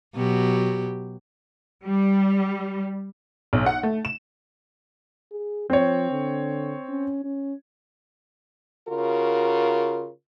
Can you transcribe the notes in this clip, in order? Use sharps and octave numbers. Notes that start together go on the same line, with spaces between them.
B2 F#3 G4
G3
B1
F#5
A3
E7
G#4
F3 C4 C#5
D3
C#4
C#4
C#3 F4 F#4 A#4